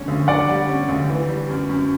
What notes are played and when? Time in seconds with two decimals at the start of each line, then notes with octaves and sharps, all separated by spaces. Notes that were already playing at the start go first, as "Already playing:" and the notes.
Already playing: D3 G3 C#4
0.08 D2
0.28 D3 D5 F#5
0.49 G3
0.68 C#4
0.89 D2
1.09 E3
1.29 G3
1.50 F#2
1.69 F#2